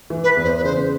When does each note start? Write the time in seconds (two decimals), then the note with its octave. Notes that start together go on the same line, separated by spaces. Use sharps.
0.10 E3
0.24 B4
0.37 E2
0.44 C5
0.57 B4
0.64 C#3 C5